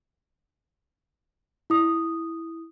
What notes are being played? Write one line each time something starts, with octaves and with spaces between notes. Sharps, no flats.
E4 D#6